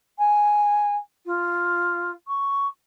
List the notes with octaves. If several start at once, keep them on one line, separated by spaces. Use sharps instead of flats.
G#5
F4
C#6